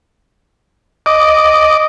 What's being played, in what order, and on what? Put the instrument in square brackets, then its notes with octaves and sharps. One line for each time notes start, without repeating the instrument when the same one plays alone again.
[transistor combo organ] D#5 D6